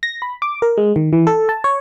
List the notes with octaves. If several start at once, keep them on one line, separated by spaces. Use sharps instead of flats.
A#6
B5
D6
A#4
G#3
D#3
E3
A4
A5
C#5